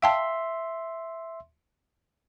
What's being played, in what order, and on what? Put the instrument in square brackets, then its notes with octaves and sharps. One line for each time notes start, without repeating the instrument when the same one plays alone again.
[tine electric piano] E5 C6 [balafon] F5 G5 A5